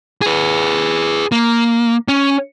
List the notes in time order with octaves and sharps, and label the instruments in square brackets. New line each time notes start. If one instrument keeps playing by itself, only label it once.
[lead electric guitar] G#4 B4
A#3
C#4